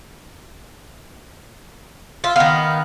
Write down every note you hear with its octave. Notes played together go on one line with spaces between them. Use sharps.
F4 E5
D#3 B3 F5